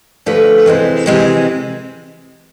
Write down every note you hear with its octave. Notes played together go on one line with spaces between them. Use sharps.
D2 D3 F3 A3 B4
C3 E3 G#3 C4
C3 E3 G#3 C4